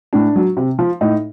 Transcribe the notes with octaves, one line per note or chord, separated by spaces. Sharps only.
A2 D4
F#3
C3
F3
A2 D#4